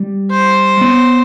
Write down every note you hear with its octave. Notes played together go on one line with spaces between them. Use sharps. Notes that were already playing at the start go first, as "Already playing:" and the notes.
Already playing: G3
C5
B3